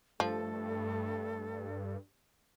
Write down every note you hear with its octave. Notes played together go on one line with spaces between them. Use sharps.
G2 F3 A3 A4